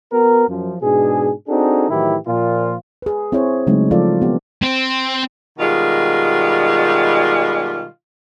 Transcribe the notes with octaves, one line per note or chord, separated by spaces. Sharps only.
B3 F#4 A#4
F#2 F3
G#2 B2 D4 G#4
C4 D4 D#4 F#4 G#4 A4
A2 D#3 E3 F#3 E4 G4
A#2 F3 F4
G#4 B4
C4 E4 G#4 C5 C#5
C#3 F#3 G#3 A3 C4 D#4
F3 F4 A4 D5
B3 G4
C4
B2 D#3 G3 G#3 F4